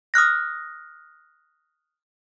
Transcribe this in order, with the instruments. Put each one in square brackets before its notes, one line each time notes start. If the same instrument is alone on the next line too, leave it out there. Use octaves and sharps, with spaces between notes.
[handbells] D#6 F6 F#6 A#6